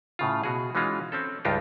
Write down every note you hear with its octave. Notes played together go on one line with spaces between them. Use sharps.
A2 C#3 F4
B2 F#4 G#4
E3 G#3 C#4 D#4 F4 F#4
C4 C#4 A4
C#2 G2 D4 D#4 F4 G4